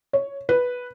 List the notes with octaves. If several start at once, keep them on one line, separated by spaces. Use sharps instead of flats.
C#5
B4